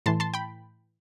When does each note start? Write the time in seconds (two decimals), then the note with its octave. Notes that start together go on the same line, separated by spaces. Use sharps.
0.06 A2 E3 A5 C6
0.20 A5 C6
0.34 G5 B5